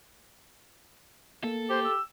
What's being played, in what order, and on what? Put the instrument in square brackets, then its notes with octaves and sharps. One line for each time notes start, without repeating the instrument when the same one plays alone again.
[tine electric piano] A#3 [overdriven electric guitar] A4
[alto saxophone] G4 [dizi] C5
[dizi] E6